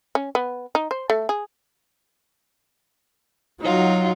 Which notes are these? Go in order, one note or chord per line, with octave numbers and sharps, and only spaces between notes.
C#4
B3
D#4
C5
A3
G#4
F#3 D#4 F4 F#4